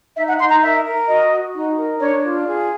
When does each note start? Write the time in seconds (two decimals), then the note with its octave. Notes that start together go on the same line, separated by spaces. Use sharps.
0.16 D#4 E5
0.28 F#5
0.40 D#4 C6
0.51 A#5
0.62 A#4 E5
0.84 A#4
1.08 F#4 D#5
1.31 F#4
1.54 D#4
1.77 A#4
2.00 D4 C#5
2.22 F4
2.45 G#4